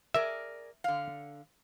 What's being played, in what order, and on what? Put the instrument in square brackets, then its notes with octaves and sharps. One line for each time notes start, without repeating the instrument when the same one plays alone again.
[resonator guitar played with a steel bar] G#4 A#4 D5 [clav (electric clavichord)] E5
[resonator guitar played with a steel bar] D3 F5